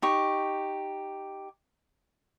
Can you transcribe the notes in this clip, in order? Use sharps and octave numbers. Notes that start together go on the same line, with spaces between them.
D#4 G4 C#6